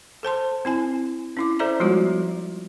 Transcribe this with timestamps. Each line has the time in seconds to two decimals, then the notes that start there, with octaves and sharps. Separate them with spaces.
0.23 A4 C5 A5 C6
0.65 C4 E4 G#5
1.37 C#4 E4 D6
1.59 A4 C5 D5 E5 A#5
1.80 F3 G3 G#3 B3 F4 F#4